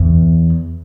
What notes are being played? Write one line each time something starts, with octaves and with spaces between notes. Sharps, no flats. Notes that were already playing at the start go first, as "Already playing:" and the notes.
Already playing: E2